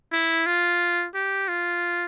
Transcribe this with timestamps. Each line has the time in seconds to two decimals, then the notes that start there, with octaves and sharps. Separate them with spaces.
0.13 E4
0.46 F4
1.15 G4
1.48 F4